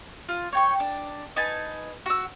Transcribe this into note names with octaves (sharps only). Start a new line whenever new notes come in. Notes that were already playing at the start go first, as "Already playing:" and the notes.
F4
C#5 G5 C#6
D4
D#4 B4 G#5 A5
F#4 E6